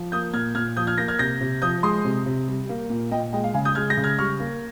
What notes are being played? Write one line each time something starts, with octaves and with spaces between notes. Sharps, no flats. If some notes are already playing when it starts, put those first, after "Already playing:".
Already playing: F3
A#3 D#6 G6
A#2 F6 G#6
A#2 F6 G#6
F3 D#6 G6
F6 G#6
A#3 G6 A#6
F6 G#6
C3 G6 A#6
C3
F3 D#6 G6
G#3 C6 D#6
C3
C3
G3
A#3
A#2
A#2 D#5 G5
G#3 D#5 G5
F5
C#3 F5 G#5
D#6 G6
G#3 F6 G#6
G6 A#6
C#3
F6 G#6
G3 C#6 F6
A#3